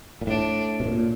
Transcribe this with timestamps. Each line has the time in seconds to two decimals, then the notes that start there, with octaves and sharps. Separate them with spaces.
0.21 A#2
0.27 A2 D4
0.80 B2
0.86 A#2